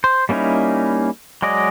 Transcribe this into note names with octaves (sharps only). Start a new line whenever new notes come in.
C5
G3 A#3 C#4 D#4 E4
F#3 G#3 D5 D#5